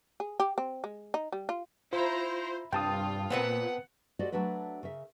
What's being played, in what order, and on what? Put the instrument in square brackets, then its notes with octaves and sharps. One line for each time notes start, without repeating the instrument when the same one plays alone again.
[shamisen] G#4
G4
C4
G#3
D#4
G3
F4
[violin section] E4 A#5 [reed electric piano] F4 [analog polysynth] C5
[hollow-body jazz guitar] C2 [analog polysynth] G2 [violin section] F4 [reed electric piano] G5 A5 D#6
[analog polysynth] A#2 [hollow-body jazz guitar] B3 C4 B4 [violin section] F#5
[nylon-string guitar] F#4 G4 A4 C5 D5 D#5
F#3 A3 D4 F#4 B4
C#3 A#4 E5